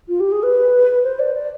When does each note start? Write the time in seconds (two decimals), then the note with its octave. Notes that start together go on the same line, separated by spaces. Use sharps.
0.08 F4
0.20 G4
0.32 G#4
0.43 B4
1.04 C5
1.19 D5
1.34 D5